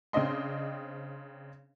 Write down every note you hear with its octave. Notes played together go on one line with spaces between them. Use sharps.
C#3 C4 D4 D#5 C6